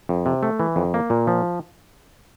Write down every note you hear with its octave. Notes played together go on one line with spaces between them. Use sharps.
F2
C3
A3
E3
F2
A#3
A#2
F3